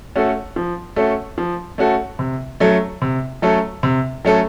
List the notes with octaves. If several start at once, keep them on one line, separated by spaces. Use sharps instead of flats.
A3 C#4 F#4 A4
F3
A3 C#4 F#4 A4
F3
A3 C#4 F#4 A4
C3
F#3 A3 C#4 A4
C3
F#3 A3 C#4 A4
C3
F#3 A3 C#4 A4